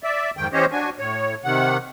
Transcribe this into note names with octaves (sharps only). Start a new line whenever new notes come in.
D5 E5
F2 G#2 D#3 G5
E3 C#4 G4 C5 C#5 D#5
D4 F#4 G#5
A2 C#5
C3 D#3 F#5